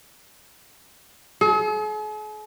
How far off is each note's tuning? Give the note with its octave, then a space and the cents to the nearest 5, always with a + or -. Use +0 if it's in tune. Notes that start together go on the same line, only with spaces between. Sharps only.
G#4 +45